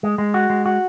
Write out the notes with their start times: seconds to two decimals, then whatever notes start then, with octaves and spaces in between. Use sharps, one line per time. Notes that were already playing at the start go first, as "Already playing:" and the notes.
0.03 G#3
0.18 G#3
0.34 F#4
0.50 G#3
0.66 F#4